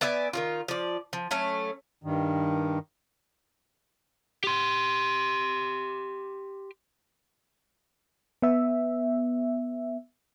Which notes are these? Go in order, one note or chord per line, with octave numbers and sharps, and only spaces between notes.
B3 D5 E5 G#5
D#3 F3 F4
F3 D5
F3
F#3 A3 C#4
G2 D#3
G4 C6
B3 E5